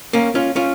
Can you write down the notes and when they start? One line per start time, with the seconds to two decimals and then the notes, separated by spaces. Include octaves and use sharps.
0.13 A#3 C#4
0.35 C#4 F4
0.56 C#4 F4